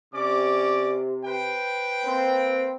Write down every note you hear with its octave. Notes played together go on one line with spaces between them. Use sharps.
C3 C#4 D5 D6
B4 C5 G5
A#3 C4